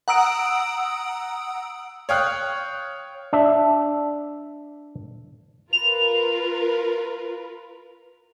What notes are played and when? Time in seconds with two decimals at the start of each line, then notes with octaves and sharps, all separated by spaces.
0.08 F#5 A#5 D#6 E6 D7
2.09 C#5 F5 G5 D#6 F6 F#6
3.33 D4 E5
5.73 F4 A#4 B4 F7